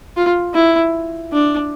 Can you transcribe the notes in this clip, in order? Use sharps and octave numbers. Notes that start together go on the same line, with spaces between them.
F4
E4
D4